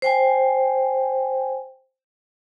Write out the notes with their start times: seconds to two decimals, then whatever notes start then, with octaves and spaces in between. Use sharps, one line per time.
0.02 C5 G5 G#5